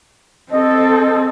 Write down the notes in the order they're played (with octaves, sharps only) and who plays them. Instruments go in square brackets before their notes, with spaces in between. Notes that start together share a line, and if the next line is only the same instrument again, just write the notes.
[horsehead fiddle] C4 A4 [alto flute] D#5